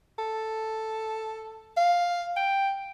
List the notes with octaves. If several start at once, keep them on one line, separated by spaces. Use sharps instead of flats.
A4
F5
G5